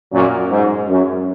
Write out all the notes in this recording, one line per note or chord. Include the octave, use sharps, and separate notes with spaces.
F#2 A#2
G#2
F#2